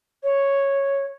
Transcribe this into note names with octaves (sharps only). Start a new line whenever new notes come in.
C#5